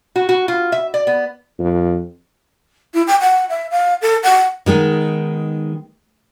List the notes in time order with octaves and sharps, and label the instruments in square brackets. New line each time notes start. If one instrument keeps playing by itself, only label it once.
[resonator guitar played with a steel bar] F#4
F#4
F4
E5
D5
B3
[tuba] F2
[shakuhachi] E4
G5
F#5
E5
F5
A4
F#5
[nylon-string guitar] D#3 G#3 B3 D#4